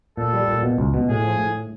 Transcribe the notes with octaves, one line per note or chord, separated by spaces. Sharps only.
A#2 A4
G3
A#2
B2
C#2
B2
A2 G#4
F3
A2